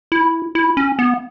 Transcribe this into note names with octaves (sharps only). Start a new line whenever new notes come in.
E4
E4
C#4
B3